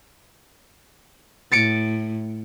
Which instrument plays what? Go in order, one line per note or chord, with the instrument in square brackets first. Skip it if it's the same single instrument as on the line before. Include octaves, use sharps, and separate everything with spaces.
[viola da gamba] A2 [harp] A6 C#7 D7